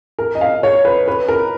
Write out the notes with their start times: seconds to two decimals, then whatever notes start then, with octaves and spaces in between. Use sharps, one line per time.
0.19 A#4
0.35 D#5
0.41 F5
0.63 C#5
0.85 B4
1.08 B4
1.28 A#4